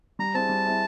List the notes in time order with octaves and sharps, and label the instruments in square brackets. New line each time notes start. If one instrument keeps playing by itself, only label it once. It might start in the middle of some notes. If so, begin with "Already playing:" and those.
[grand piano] G3 [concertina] A#5
[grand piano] C4 E4 G#4 [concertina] A5
[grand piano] G3
C4 E4 G#4